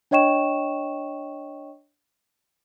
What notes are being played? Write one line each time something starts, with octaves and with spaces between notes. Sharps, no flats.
D4 C#5 D#5 G5 C#6 E7